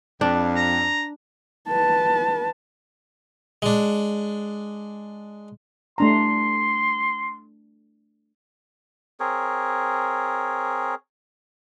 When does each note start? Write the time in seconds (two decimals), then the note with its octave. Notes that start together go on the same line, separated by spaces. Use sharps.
0.21 F2 D4
0.56 A#5
1.68 B4 A5
3.62 G#3 D4
5.98 A3 D4 A#5 C6
9.20 C4 G#4 A#4 C#5